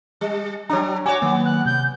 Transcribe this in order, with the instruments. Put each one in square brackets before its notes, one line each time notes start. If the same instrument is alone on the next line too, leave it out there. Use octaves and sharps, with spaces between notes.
[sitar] G3
[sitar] F#3 D4 [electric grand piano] C#5 A#5
[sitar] F#4 C#5 [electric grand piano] G#5 [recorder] D6
[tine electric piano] D#3 F#3 A#3 [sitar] B3
[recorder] F#6
[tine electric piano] C3 [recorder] G6